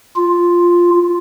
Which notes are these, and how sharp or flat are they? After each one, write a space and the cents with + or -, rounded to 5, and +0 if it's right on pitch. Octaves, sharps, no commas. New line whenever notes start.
F4 +0